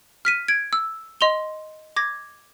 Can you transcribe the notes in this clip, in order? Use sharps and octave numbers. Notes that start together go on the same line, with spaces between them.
F6 B6 D#7
G#6 D7
E6
D#5 C6 F7 G7
D6 G#6 A#6